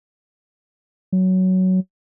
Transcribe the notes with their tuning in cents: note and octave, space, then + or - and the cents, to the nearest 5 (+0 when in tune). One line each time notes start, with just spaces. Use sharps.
F#3 +10